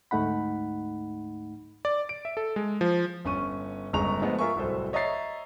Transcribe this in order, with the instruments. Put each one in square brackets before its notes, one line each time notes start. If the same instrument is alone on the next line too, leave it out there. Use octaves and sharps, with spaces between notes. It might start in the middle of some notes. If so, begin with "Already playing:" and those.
[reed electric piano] D2 G#2 A3 D#4 F#5 B5
[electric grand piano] D5
D7
E5
A4
G#3
F3
[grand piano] G1 C#4 C#6 D#7
G1 C#3 G#3 A#5 C#6 F7
F3 G#3 A3 B3
F4 A#4 E5 G#5 C#6
D1 C2 A4 C5
C#5 D#5 E5 A#5 A6 C7